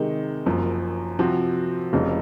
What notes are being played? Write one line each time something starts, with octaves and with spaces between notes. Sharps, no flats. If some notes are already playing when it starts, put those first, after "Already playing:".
Already playing: C3 D#3 G#3 D#4
F#1 F#2 F3
C3 F3 C4 F#4
F1 F2 C#3 G#3 D#4